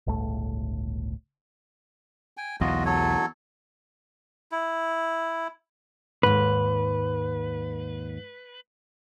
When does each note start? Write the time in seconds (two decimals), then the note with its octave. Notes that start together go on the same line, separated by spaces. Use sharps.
0.07 G1 C#2 A2 A3
2.37 G5 G#5
2.61 B1 E2 F4 F#4 D#5
2.85 F#3 A4 C#5
4.52 E4
6.23 D#2 G#2 B4